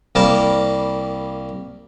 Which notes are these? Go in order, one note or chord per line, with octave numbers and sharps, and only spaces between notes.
C2 G3 A#3 A#4 A5